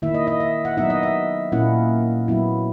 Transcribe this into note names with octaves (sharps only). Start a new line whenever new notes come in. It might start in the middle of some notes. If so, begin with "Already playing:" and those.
D#3 A#3 E4 E5
D#5
D#5
E5
F#5
F#3 B3 D#4 E5
D#5
E5
A#2 A#3 C#4 E4 F#5
F#3 B3 E4